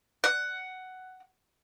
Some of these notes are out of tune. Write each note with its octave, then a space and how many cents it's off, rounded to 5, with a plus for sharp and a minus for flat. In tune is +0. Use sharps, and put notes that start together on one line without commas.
F#5 +10